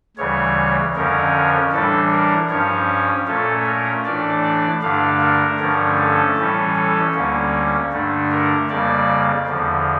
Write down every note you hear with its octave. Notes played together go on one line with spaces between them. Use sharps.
D2 C#3 E3 G3 C#5
F2 D3 F3 C#4 A#4
A2 E3 G3 D4 A4
A#4
G2 F3 C#4 C#5
A#2 A3 C#4 A4
A#4
A2 E3 A3 D4 D5
D5
G2 D3 A3 D4 F5
A#4
G2 D3 F3 A3 C#4
A4
A2 E3 G3 C#4
A4
D2 D3 G3 A#3 C#4
G2 D3 A3 D4
A#4
F2 C#3 G3 A#3 D5
E2 D3 F3